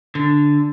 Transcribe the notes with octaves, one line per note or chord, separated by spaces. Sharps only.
D3